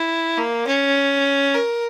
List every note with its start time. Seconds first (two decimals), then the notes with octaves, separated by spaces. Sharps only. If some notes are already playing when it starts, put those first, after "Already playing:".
Already playing: E4
0.37 A#3
0.67 C#4
1.54 A#4